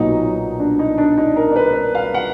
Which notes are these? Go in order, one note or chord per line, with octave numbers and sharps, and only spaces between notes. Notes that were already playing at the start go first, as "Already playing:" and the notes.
Already playing: B1 A#2 F#3 B3 D#4
D4
D#4
D4
D#4
A#4
D5
B4
F5
F#5